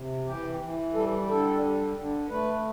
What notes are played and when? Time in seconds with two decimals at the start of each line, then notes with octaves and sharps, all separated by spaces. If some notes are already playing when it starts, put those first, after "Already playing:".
Already playing: C3
0.25 E3 G4
0.60 E3
0.94 G3 A4
1.28 D3 A4
1.61 G3
1.96 D3
2.29 A3 B4